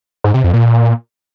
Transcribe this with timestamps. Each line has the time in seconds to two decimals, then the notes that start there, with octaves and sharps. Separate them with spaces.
0.24 G#2
0.34 C3
0.44 F2
0.53 A#2